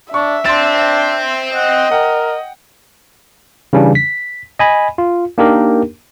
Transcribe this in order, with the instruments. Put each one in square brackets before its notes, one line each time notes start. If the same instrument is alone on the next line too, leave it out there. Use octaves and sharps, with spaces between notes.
[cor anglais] D4 [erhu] E5 [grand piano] C#6
[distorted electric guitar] C4 [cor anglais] D4 [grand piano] C6 A6
[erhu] D#5 [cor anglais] F#5
[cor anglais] A#4 [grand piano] F#5 G5
[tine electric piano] C#3 E3 G3 C#4 D4
B6
D#5 G#5 B5
F4
A#3 D4 D#4 G4 A#4